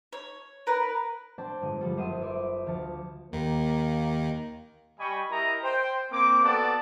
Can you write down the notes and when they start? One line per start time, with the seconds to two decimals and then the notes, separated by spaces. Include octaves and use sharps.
0.13 C#5
0.67 A#4 B4
1.38 C4 D4 C5 D5 G5 A5
1.61 G1 G#2 D3 D#6
1.81 D3 F3 G3 A4
1.97 F#1 F#2 C5 D#6 D#7
2.21 B4 C5 D5 E5 D6 D#6
2.66 D2 F3 A5 C#7
3.32 D#2 D#3 A#3
5.00 G3 D#5 G5 G#5 B5 C#6
5.31 E4 G4 A#4 D#5 A#5
5.62 C5 G5
6.11 A#3 C4 D6
6.43 B3 F#4 A4 D5 A5